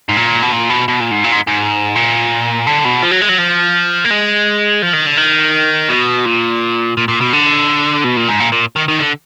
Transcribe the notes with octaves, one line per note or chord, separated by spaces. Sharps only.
G#2
A#2
B2
A#2
B2
B2
A#2
G#2
A#2
G#2
G#2
A#2
D3
B2
F3
F#3
G#3
F#3
F3
A#3
G#3
F3
D#3
D3
D#3
B2
A#2
A#2
A#2
B2
D3
B2
A#2
G#2
A#2
A#2
D#3
D#3
D3